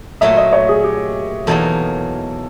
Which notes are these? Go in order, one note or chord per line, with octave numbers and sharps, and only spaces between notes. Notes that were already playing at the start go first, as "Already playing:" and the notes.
A#2 F#3 A3 E5
D#5
C#5
G#4
G4
E2 B2 F#3 A#3 D#4 A4